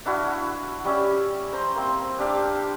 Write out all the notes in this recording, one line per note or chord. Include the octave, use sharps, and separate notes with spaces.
D4 E4 F#4 F5
F#5
G3 C#4 E5
C5 A#5 C6
A#3 C4 E5
D4 G4 F5